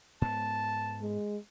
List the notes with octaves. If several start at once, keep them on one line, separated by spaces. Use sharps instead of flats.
G#2 B3 A5
G#3